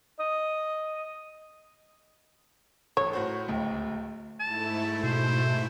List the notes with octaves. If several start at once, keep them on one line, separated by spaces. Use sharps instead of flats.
D#5
A1 A4 C#5
A2 F#4 C5 C#6
D1 C#2 A3 G5
G#2 A3 E4 A5
B2 C5